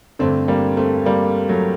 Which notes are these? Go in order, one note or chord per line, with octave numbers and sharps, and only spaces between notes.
G2 D3 A3 C4
G3 A#3
A3 C4
G3 A#3
F#3 A3